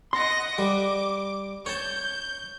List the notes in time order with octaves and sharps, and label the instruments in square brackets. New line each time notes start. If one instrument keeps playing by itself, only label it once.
[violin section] D#5 F#5 A#6 [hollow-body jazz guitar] C6
[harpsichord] G3 [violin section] D6
[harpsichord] C#5 A5 [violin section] G6